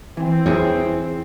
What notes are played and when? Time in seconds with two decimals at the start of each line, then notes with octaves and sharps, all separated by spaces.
0.17 E3 C4
0.46 E2 E4 G#4 C#5